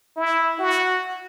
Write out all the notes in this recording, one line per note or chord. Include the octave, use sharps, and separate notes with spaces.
E4
F#4